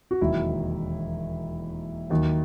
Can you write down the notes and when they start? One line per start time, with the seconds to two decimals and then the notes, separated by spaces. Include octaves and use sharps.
0.11 F#4
0.21 E1 D#2 D#3 F#3 E4
2.10 D#2 D#3 F#3